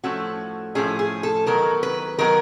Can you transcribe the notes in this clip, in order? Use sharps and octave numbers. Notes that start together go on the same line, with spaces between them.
A2 F3 A3 C#4 F#4
A2 F3 A3 C#4 G#4
G#4
A4
D#3 F#3 B3 A#4
B4
D#3 F#3 B3 A#4